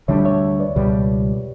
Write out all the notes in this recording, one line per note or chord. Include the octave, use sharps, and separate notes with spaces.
D2 D3 G3 D4 C#5 E5
C#5 E5
B4 D5
C#2 B2 G3 G4 B4